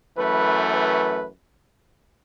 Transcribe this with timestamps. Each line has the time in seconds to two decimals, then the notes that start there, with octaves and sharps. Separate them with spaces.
0.16 F#2 E3 A3 B4
0.74 B4